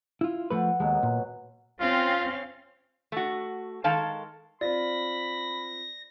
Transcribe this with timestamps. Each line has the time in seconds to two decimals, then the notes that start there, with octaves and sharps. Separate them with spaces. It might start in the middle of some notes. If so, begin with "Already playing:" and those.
0.21 E4 F4
0.50 F3 A3 F#4 B4
0.80 D#2 B2 F#3 G#3 B3
1.03 A#2
1.81 C4 C#4 F4 F5
3.12 A3 F#4
3.84 D#3 G#3 A4 F5 A5
4.61 C4 F4 D5 B5 A#6